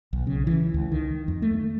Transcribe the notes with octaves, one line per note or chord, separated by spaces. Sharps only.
B1
C#3
E3
C#2
D#3
F2
A3